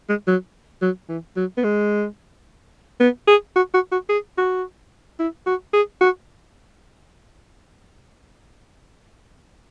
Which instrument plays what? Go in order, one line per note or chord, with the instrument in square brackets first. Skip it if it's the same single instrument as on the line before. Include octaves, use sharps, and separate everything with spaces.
[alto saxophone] G#3
F#3
F#3
E3
F#3
B3
G#3
B3
G#4
F#4
F#4
F#4
G#4
F#4
E4
F#4
G#4
F#4